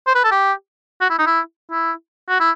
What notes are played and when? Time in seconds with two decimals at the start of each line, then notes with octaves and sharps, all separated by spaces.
0.07 C5
0.15 B4
0.24 A4
0.31 G4
1.01 F#4
1.10 E4
1.19 D#4
1.26 E4
1.71 E4
2.29 F#4
2.40 E4